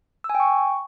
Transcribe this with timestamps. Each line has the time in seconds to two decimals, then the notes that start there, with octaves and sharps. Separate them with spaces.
0.24 E6
0.30 G#5
0.35 G5
0.40 C#6